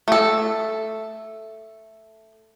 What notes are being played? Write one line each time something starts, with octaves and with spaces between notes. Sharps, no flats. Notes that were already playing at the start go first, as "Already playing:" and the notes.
A3 A4